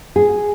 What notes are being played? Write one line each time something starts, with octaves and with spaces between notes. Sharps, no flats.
G#4